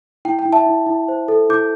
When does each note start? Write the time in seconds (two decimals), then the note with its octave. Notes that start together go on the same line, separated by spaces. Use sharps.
0.25 E4 G5
0.39 G5
0.45 E4
0.53 E5 A5
0.66 E4
0.86 E4
1.08 C5
1.28 A4
1.49 E4 D6 G6